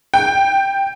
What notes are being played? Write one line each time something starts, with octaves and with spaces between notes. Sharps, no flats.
G5